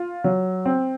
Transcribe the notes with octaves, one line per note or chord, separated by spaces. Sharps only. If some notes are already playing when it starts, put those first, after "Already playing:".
Already playing: F4
F#3
C4